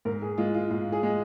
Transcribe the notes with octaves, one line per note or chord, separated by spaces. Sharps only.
G#2 A#4
G#4
G#3 F4
F4
G#2 F4
G#4
G#3